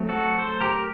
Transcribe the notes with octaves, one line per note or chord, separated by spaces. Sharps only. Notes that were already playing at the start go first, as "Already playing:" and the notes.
Already playing: F#3 A3 C4
F#4 A4
A4 C5
G4 A#4